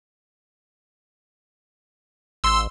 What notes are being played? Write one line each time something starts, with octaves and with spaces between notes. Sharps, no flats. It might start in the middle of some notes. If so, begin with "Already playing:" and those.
A1 C6 E6